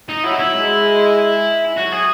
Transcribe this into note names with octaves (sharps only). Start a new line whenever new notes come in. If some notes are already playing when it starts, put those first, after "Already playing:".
D#4
F#3 E4
E4
G#3
F#3 F#4
G#4